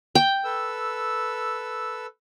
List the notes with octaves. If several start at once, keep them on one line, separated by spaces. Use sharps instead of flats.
G5
A4 B4 E6